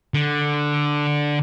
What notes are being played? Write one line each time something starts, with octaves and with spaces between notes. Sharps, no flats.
D3